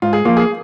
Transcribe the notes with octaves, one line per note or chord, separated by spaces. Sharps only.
G#2 F4
G#4
F3 A#3 F4
G#4